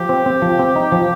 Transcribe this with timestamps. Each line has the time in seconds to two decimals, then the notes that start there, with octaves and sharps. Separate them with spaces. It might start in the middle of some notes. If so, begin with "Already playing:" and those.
Already playing: F3 G4
0.09 C4
0.26 C4
0.42 F3
0.59 C4
0.76 D#4
0.92 F3